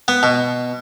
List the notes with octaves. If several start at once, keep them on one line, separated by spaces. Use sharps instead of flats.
B3
B2